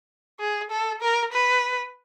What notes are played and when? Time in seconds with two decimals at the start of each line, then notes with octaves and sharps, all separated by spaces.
0.40 G#4
0.71 A4
1.02 A#4
1.33 B4